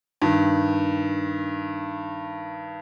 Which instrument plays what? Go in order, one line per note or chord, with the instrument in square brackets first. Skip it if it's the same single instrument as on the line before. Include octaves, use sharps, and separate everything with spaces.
[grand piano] G2 D#3